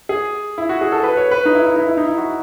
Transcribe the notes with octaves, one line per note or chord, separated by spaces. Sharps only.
G#4
E4
F#4
G#4
A4
B4
C#5
B4
D#4
E4
E4
D#4
E4
D#4
E4
F#4